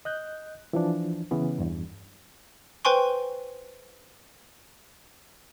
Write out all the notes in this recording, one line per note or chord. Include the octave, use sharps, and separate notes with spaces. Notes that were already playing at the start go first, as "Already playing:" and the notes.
D#5 F#6 G6
E3 F3 D4
C#3 E3 B3 C#4
E2 G2
B4 C5 G5 G#5 C6 C#6